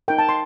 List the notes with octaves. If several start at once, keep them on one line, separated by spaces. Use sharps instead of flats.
D#4 A#4 G5
A5
C6